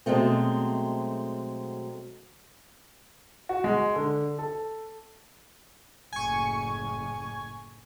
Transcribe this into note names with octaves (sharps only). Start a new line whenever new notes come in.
B2 F#3 G#3 A3 C4
F#4
G#3
D3
A4
F#1 A2 G#5 C#6